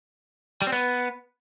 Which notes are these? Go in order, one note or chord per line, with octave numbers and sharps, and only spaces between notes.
G3
C4
B3